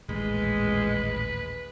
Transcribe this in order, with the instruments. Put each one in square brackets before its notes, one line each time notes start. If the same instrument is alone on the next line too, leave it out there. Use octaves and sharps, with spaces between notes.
[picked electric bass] D#1 A1 D#2 [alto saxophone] G#3 [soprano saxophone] B4